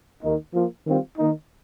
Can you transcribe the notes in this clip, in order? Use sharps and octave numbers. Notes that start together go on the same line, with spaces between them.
D#2 D#3 A#3 D#4
F3 A#3 F4
D#3 G3 C4 F4
D#3 A#3 D#4